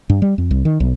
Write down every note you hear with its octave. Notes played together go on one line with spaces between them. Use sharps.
G2
G3
F2
C2
D#3
B1